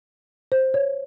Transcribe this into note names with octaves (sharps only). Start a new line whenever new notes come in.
C5
C#5